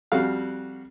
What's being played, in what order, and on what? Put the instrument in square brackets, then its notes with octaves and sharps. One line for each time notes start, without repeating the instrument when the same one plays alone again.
[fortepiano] F2 G3 F#4 F5